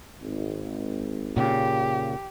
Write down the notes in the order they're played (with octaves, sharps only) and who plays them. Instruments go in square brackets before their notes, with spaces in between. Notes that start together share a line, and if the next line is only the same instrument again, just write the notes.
[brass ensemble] G#1
[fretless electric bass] A#2 C#3 [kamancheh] G4